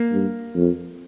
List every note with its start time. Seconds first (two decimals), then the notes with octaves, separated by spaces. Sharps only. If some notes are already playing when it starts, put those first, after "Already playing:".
Already playing: A#3
0.12 G2
0.56 F2